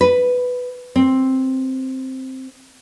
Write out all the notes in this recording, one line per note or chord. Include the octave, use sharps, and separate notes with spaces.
B4
C4